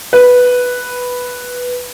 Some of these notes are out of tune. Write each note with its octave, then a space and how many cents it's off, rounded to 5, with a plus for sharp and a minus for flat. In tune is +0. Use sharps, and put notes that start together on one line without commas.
B4 +0